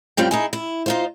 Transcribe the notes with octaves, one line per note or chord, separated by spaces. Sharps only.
F#2 G3 C4 F4 G5
D#4 E4 G#4
E4
D#4 F4 C5